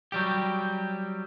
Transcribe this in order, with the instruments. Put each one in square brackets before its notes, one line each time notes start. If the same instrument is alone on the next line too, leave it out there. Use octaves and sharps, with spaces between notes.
[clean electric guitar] F#3 G3 G4